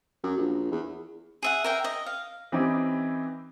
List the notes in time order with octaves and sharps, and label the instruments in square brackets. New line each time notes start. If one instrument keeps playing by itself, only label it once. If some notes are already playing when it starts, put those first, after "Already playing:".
[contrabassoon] F#2
A#1
E2
[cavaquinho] G#4 E5 F#5
A#4 E5 G5
D#5
F5
[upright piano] E3 C4 C#4 D#4 E4 G4